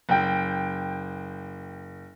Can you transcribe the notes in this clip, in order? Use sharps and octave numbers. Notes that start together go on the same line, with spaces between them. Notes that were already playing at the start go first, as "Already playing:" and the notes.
F#1 G5